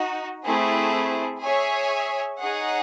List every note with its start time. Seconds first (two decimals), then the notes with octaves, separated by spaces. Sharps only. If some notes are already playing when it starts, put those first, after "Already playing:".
Already playing: D#4 F#4
0.44 A3 C4 E4 G#4
1.42 G#4 C#5 E5 G#5
2.39 D#4 G#4 C#5 F#5